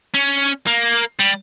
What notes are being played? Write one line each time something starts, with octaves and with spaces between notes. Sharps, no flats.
C#4
A#3
G3